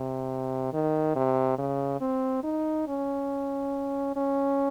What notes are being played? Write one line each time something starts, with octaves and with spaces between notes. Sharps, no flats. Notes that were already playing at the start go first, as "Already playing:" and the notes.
Already playing: C3
D#3
C3
C#3
C4
D#4
C#4
C#4